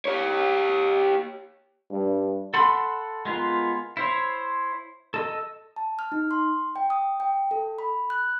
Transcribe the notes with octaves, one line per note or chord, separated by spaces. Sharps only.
G4 C#5
G2
A4 F#5 B5 C6
G#3 B3 F4 A#4
E4 C5 C#5
A4 D#5 E6
A5
F6
D#4
C6
G5
D#6
G5
A4
B5
F#6